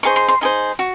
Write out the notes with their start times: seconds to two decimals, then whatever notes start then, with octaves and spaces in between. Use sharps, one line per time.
0.03 D#4 G#4 C5 C#6
0.16 C6
0.28 C6
0.41 D#4 G#4 C5
0.79 F#4